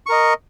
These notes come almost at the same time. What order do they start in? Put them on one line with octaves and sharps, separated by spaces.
C#6 A#4 D#5